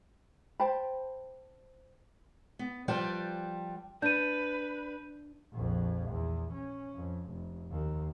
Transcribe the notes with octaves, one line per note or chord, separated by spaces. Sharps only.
C5 G5 A5 B5
B3
F3 G3 B4 D5 G5 A5
D4 B4 G6 D#7
A#1 F2
E2
C#4
F2
F1
D#2